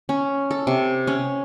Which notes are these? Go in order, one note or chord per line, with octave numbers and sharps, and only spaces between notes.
C#4
A4
C3
C#4